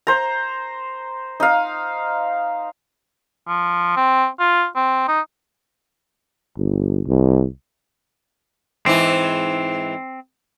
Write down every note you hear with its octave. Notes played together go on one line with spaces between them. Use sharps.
C5 A#5
D#4 F5
F3
C4
F4
C4
D#4
G1
C2
G#2 E3 C4 E4